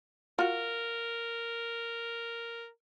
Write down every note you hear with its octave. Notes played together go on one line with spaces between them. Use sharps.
F4 F#4 A#4